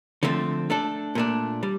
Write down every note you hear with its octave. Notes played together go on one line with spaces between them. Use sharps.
D3 F3 A3 C4
A3 D4 A4
A#2 A3 D4
G3